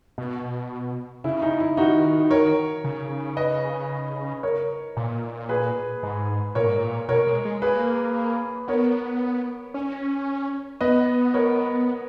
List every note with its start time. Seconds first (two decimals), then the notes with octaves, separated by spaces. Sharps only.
0.18 B2
1.24 C#3 E4
1.42 D#4
1.60 E4
1.77 D#3 D#4 F#4
2.31 A#4 C#5
2.84 C#3
3.37 B4 D#5
4.43 A#4 C#5
4.97 A#2
5.49 G#4 B4
6.03 G#2
6.55 A#2 A#4 C#5
6.67 G#2
6.78 A#2
7.08 B2 A#4 C#5
7.27 G#3
7.45 G#3
7.62 A#3 G#4 B4
8.68 B3 A#4 C#5
9.74 C#4
10.81 B3 B4 D#5
11.34 A#4 C#5